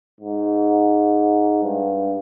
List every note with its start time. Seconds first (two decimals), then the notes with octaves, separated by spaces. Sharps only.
0.20 G#2
1.63 G2